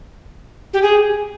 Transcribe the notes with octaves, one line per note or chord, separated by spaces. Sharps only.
G4
G#4